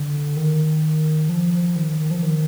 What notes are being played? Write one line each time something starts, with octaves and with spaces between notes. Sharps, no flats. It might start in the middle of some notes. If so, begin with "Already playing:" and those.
Already playing: D3
D#3
F3
F3
D#3
D#3
D#3
F3
D#3